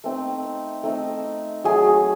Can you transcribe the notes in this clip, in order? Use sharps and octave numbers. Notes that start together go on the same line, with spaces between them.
A3 C4 D#4
A3 C4 D#4
F#3 A3 G#4